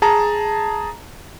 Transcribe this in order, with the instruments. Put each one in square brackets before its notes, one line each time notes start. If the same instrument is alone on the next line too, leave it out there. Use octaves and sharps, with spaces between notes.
[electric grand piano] G#4 A5 A#5